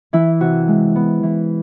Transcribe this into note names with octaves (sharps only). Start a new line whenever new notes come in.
E3 E4
C3 F#4
G#3
B3
E3